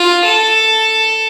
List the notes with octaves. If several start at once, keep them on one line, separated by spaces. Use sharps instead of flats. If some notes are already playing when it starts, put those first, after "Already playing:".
Already playing: F4
A4